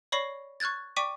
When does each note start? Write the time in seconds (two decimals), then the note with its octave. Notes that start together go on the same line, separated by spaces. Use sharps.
0.12 C#5 D5 B5 C#6 A#6 C7
0.60 C#6 F6 F#6 G#6 A6
0.96 D5 G5 C#6 D6 B6 D#7